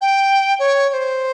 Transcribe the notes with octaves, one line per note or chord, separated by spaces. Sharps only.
G5
C#5
C#5
C5